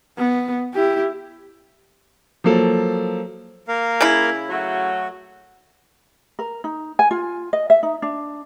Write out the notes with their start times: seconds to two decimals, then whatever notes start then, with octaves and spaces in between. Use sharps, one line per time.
0.18 B3
0.74 E4 G4
2.44 F3 F#3 A#3 A4
3.68 A#3 A#4 F5
4.01 C#3 E4
4.49 F#3 A3 F#4
6.39 A#4
6.64 D#4
6.99 G#5
7.11 F4
7.53 D#5
7.70 E5
7.83 D#4
8.02 D4